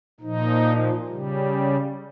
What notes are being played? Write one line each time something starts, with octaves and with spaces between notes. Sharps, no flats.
A#2 F3 D#4
C#3 G3